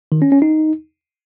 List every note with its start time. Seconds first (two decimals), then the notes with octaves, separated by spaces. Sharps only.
0.12 D#3
0.22 C#4
0.32 C#4
0.42 D#4